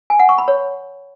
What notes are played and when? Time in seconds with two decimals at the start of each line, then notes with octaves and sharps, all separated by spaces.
0.10 G#5
0.19 F#5
0.29 C#6
0.38 B5
0.48 C#5